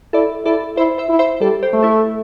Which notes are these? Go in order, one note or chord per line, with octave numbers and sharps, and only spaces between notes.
E4 A4 D5
E4 A4 D5
E4 C5 E5
C5 E5
E4
C5 E5
G3 A4 D5
G4 C5
A3
E4 A4